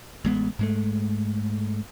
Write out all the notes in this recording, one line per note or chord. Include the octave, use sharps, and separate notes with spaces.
A1 G#3 B3
G#2 G#3 A3